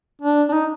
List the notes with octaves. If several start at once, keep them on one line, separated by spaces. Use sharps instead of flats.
D4
D4
D#4